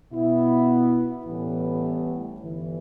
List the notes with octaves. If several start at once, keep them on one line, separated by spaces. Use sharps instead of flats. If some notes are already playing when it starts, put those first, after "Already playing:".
B2 B3 E4
A1 A2 E3 G3 B3
G1 G2 E3